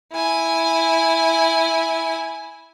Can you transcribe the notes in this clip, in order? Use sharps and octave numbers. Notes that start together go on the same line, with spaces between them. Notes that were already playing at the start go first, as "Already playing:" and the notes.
E4 G#5